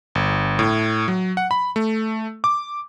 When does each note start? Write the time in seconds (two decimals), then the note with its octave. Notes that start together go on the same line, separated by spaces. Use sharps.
0.15 G1
0.59 A2
1.08 F#3
1.37 F#5
1.51 B5
1.76 A3
2.44 D6